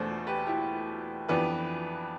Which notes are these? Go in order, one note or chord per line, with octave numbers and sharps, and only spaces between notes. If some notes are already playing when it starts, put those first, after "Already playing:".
Already playing: E2 B2 A3 D4 A4 C5
G4 B4
E4 G4
F2 E3 B3 D4 G4 B4